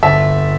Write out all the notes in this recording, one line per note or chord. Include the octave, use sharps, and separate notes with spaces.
G1 E5 A5